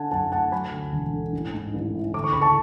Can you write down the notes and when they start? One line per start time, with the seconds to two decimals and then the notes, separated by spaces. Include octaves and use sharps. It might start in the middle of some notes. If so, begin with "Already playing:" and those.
Already playing: D3 D4 F#5 G#5 A5
0.11 F#2 F#5 A5
0.32 A3 F#5 A5
0.52 F#3 G#5 B5
0.72 D2
0.93 E1
1.13 D3
1.33 A1
1.54 G#2
1.74 A1
1.95 E3
2.14 D2 D6
2.24 C#6
2.33 C#3 B5
2.41 A5 C#6